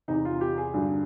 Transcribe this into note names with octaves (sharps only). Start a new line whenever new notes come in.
E2 C3 E3 D#4
F4
G4
G#4
G2 D3 F#3